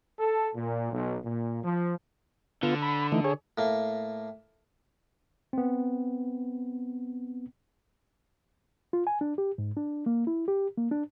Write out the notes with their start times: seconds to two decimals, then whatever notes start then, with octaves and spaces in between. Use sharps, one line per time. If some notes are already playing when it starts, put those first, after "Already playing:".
0.19 A4
0.55 A#2
0.91 B1
1.25 A#2
1.63 F3
2.63 D3 B3 F4
2.82 B5
3.12 E3 A3 D#4
3.24 G#4 C#5
3.58 A2 A#3
5.53 B3 C4
8.93 F4
9.07 G#5
9.21 D4
9.38 G4
9.58 G#2
9.77 D4
10.06 A#3
10.27 E4
10.48 G4
10.77 A#3
10.91 D4